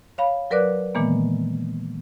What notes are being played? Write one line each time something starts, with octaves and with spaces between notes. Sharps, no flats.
C#5 F5 B5
F#3 A#4 B4 D5 D6 F#6
A#2 D#3 E3 G#3 A#3 B3